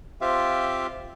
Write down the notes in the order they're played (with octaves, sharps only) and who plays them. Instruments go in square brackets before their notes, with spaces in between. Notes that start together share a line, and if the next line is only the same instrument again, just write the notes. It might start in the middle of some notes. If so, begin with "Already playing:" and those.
[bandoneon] C4 F4 G4 E5 F5